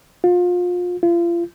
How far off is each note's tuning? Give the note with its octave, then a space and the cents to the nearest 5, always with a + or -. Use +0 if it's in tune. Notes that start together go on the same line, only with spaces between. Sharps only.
F4 +30
F4 -35